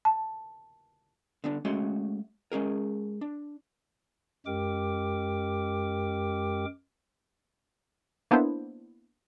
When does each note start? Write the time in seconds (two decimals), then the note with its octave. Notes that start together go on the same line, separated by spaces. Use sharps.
0.05 A5
1.44 D3 B3 D4
1.65 G#3 A3 C#4 F#4 C6
2.52 G#3 C#4 G#4 A#4
3.21 D4
4.46 F#2 G#3 G4 A#4 G5 D6
8.31 A#3 B3 D4 E4 C5